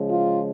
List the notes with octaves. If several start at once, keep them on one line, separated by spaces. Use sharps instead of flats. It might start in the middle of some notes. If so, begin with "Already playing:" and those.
Already playing: C#3 F3 G#3
F4